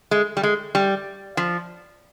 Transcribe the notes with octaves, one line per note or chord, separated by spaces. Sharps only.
G#3
G3
G#3
G3
F3